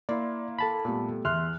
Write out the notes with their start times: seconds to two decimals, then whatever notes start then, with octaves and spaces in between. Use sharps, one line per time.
0.09 A#3 E4 D5 C6
0.59 A4 A5 B5
0.85 A#2 G3 A3 B3
1.25 E2 E5 C6 F6 F#6